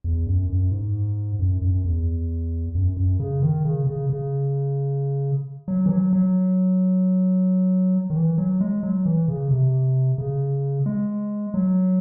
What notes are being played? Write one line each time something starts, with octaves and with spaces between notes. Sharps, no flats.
E2
F#2
F#2
G#2
F#2
F#2
E2
F#2
F#2
C#3
D#3
C#3
C#3
C#3
F#3
E3
F#3
F#3
D#3
E3
F#3
G#3
F#3
E3
C#3
C3
C#3
G#3
F#3